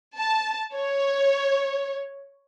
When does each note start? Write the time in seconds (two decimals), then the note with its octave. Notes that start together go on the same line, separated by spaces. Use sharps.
0.17 A5
0.75 C#5